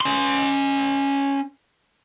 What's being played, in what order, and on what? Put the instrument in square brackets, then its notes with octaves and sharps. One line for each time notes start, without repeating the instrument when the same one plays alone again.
[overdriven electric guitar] C#4 C6